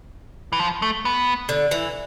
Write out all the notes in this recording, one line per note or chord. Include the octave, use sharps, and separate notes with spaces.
E3
F3
A3
B3
D3
E3